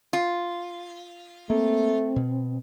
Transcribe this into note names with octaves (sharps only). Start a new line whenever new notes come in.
F4
A3 A#3 C4
B2